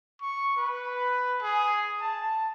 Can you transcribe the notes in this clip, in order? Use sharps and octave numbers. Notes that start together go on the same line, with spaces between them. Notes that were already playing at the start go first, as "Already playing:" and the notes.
C#6
B4
G#4
A5